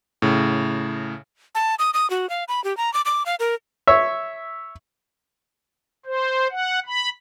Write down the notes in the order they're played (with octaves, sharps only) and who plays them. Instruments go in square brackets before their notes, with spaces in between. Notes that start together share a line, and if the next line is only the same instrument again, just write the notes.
[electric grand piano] A2 C#3
[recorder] A5
D#6
D#6
F#4
F5
B5
G4
A#5
D6
D6
F5
A#4
[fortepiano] C#5 E5
[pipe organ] C5
F#5
B5